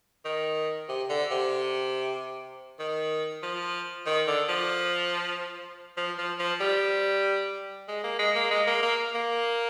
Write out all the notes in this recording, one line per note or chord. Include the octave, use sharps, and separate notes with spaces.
D#3
C3
D3
C3
D#3
F3
D#3
D3
F3
F3
F3
F3
G3
G#3
A#3
G#3
A#3
G#3
A#3
A#3
A#3